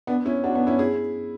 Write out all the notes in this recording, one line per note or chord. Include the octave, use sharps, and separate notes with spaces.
B3 D4
C#4 E4
D4 F#4
B3 D4
C#4 E4
E4 G#4